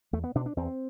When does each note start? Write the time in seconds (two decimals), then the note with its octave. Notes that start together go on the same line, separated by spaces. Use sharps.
0.13 E2 A3
0.24 B3
0.35 B2 D4
0.46 D4
0.57 E2 C4